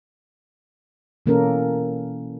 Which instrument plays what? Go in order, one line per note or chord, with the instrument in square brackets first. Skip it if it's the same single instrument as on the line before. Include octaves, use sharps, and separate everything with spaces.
[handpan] B2 E3 A#3 C#4 A4 A#4